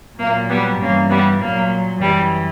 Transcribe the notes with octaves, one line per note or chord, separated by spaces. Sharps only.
A#2 F#3 A#3
G3 B3
G2 E3 A#3 C#4
G3 B3
A#2 F#3 A#3
F#2 E3 G3